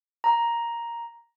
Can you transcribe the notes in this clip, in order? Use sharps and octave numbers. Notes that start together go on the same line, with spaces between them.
A#5